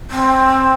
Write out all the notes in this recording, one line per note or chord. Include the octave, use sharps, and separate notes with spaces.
C4